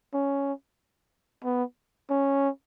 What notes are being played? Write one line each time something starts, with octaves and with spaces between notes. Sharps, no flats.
C#4
B3
C#4